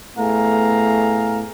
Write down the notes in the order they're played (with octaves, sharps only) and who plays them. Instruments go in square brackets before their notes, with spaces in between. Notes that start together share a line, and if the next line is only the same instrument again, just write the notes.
[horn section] A2 A3 B3 G#4 F5 A#5